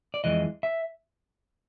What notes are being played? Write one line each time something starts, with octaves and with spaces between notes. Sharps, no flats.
D5
F2 C#3 E3 G#3 D#5
E5